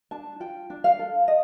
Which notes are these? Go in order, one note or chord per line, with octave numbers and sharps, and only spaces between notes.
D4 A5
F4 G5
D4
F5
A4
D#5